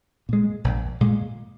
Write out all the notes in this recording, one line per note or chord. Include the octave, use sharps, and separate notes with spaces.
A#2 G#3
A#1
A#2 G#3